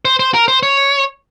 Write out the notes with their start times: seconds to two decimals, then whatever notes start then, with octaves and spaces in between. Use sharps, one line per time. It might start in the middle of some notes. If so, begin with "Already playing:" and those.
0.05 C5
0.20 C5
0.34 A#4
0.48 C5
0.63 C#5